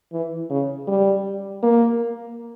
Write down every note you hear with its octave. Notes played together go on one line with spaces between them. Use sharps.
E3
C#3
G3
A#3